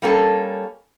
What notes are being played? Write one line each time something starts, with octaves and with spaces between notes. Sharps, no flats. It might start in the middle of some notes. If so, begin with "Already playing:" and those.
G3 A#3 C#4 A4